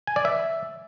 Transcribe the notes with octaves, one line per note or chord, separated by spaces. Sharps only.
G#5
D5
E5